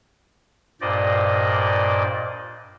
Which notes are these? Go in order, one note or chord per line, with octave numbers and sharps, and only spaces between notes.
G2 A#2 C5 D5 D#5